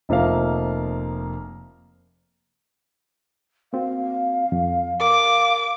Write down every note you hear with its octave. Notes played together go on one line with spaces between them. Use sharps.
F1 F3 A#3 E5 F5
A#3 C4 F#4 F5
F2
A#4 F5 D6